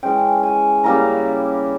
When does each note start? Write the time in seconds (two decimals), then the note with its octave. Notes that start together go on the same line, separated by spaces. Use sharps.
0.03 E3 G#3 C#4 G5
0.43 G#5
0.84 C#3 G3 A#3 E4 A#5